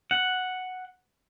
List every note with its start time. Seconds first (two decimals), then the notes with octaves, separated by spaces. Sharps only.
0.11 F#5